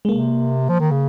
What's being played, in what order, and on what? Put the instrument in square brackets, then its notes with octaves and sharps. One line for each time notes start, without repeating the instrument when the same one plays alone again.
[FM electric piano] G#3
[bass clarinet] C3 [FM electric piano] A#3
[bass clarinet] F3
D#3
C#3